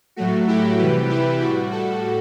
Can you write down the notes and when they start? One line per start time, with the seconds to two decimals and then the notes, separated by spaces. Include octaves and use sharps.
0.16 A2 F#3 A3 F#4
0.47 E4 G4
0.79 C3 E3 G3 G4 B4
1.10 E4 G4
1.41 A2 G3 F#4
1.72 F#4 A4